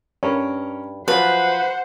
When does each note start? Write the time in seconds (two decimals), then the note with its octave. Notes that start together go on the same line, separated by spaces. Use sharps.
0.23 G2 C#4 A#4
1.08 F3 F#3 B4 C5 F#5